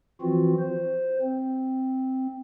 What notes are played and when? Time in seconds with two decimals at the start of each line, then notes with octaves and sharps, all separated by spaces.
0.21 E3 F3 C4 F4 F#4
0.60 C5
1.22 C4